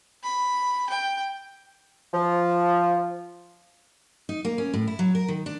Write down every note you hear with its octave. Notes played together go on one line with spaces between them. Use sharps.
B5
G5
F3
D#4
A#3
C#4
A2
E4
F#3
A#4
D#3
D4